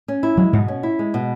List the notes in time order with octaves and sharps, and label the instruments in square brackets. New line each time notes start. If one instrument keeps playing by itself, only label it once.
[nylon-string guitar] C#4
E4
[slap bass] F#3 [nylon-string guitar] G#3
[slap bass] G#2 [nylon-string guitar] B2
[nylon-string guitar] C#4
E4
G#3
B2